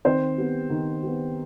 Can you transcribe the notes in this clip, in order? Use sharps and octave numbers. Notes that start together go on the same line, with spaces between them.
D#3 C4 C5
G3 B3
D#3
G3 B3